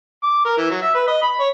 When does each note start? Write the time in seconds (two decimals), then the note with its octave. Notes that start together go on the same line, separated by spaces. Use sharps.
0.23 D6
0.45 A#4
0.57 E3
0.70 F#3
0.82 E5
0.94 B4
1.07 D#5
1.21 B5
1.40 C#5